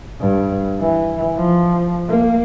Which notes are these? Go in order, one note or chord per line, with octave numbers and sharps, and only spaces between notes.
G2
E3
F3
A#3